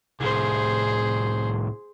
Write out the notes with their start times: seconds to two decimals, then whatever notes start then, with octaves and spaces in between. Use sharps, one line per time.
0.20 C2 A2 G#4 C5